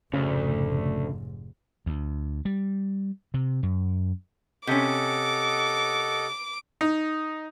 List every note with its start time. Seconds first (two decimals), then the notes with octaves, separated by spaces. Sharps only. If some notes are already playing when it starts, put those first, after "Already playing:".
0.13 F1 D2 G#2 C#3
1.86 D2
2.45 G3
3.34 C3
3.63 F#2
4.67 C3 C#4 A4 D#5 F#5 D6
6.81 D#4